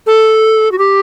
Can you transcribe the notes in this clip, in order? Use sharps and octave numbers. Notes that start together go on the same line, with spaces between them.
A4
F#4
G4